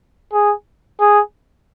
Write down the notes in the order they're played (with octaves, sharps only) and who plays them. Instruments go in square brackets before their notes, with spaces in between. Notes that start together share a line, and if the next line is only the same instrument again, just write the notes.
[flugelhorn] G#4
G#4